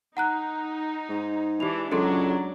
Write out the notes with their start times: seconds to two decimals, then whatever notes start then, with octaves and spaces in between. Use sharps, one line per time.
0.17 D#4 F#5 A#5 F#6
1.09 G#2
1.60 E3 D4 G4 F7
1.92 C#2 F#3 D4 G#4 A4 C6